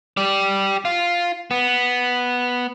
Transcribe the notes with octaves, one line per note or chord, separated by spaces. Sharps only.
G4 D5
F4
B3